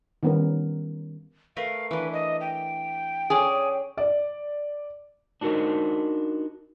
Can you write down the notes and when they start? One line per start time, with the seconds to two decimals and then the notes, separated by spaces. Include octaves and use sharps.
0.23 D#3 G3 B3 C#4 A#4
1.57 A3 A#4 B4 F5
1.91 E3 D4 B4
2.13 D#5
2.41 G5
3.30 C#4 G#4 D5 G#5
3.97 D5
5.41 D4 D#4 F#4 A#4 D#5